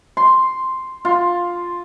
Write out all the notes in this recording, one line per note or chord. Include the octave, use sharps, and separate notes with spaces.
C6
F4